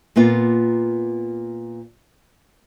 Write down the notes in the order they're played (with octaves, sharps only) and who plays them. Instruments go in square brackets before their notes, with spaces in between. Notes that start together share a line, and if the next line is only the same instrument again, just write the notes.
[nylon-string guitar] A#2 A#3 B3 F4